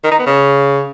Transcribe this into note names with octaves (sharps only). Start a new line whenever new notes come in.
D#3
D#4
B3
C#3